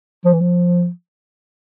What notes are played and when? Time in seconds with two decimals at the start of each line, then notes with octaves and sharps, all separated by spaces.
0.25 F3
0.33 E3
0.41 F3